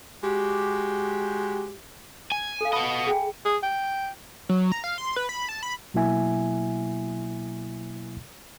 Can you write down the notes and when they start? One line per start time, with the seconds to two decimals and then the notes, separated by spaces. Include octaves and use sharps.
0.23 G#3 F#4 G4
2.32 G#5
2.61 A4 F5
2.73 B3 D#5 A5 B5
3.07 G#4 G5 G#5
3.45 G#4
3.63 G5
4.49 F#3
4.72 A#5
4.84 F5
4.98 C6
5.16 B4
5.29 B5
5.49 A5
5.63 B5
5.94 B2 F#3 A#3 E4 E5 G#5